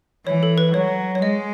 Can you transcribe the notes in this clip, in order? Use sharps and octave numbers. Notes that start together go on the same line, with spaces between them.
E3 C#5
A4
B4
F#3 C#5
C#5
G#3 D#5